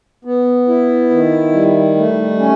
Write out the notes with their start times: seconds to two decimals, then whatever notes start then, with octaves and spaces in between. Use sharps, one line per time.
0.25 B3
0.68 E4
1.10 D#3
1.53 G3
1.96 A3
2.39 C#4